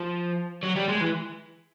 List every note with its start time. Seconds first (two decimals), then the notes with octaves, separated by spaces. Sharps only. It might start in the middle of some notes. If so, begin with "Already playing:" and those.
Already playing: F3
0.63 F#3
0.76 G3
0.89 G#3
1.01 E3